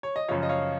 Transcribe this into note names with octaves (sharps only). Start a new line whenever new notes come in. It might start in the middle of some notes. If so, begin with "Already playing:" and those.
C#5
D#5
F#2 C#3 F3 C#5 F5
D#5
C#5 F5